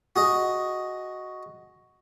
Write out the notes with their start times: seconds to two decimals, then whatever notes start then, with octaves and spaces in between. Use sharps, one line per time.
0.16 F#4 G#4 D#5